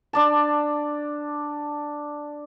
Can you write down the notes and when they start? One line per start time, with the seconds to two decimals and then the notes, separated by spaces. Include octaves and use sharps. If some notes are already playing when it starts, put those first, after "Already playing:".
0.13 D4 D5 A5